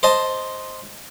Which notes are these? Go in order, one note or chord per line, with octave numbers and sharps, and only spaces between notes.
C5 D#5 A5